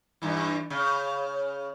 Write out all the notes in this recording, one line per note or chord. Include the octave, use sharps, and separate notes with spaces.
G2 E3
C#3